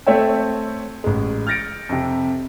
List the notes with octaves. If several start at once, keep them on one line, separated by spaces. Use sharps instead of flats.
A3 C4 A4 C#5 E5 G5
A1 G#3
F6 G6 A6 A#6 C#7 D7
F2 C3